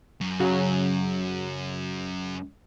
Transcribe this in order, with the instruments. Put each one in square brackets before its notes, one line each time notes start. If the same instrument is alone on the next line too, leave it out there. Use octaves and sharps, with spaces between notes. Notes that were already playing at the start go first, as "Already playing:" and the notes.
[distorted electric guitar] F#2
[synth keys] C#3 F#3